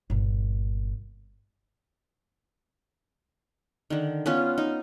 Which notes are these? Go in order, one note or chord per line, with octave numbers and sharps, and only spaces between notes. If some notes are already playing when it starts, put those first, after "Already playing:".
G1 A#2
D3 D#3
B3 C#4 F4
D#4